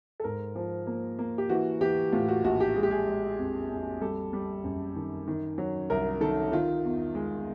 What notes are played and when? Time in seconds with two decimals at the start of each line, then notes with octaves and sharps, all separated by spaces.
0.20 A4
0.24 G#2 A#4
0.55 F3
0.87 A#3
1.19 A#3
1.38 G4
1.49 E3 F#4
1.81 E3 G4
2.12 A2 F4
2.28 F#4
2.44 A#1 F#4
2.60 G4
2.76 G#3 G#4
2.83 G4
2.91 G#4
3.07 G#3
3.38 F2
3.70 F2
4.01 G3 A4
4.33 G3
4.64 F#2
4.96 D#3
5.27 D#3
5.58 F#3
5.90 C2 A#4
6.21 D#3 A4
6.52 D#3 F4
6.84 E2
7.15 G#3